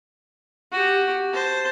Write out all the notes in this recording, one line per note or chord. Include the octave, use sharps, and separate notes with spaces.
F#4 G4
C5 A5